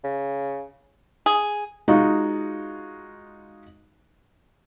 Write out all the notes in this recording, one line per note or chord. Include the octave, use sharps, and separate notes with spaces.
C#3
G#4
G#3 D#4 F4 F#4